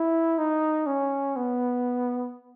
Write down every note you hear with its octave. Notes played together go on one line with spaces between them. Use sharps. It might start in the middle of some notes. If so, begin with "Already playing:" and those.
Already playing: E4
D#4
C#4
B3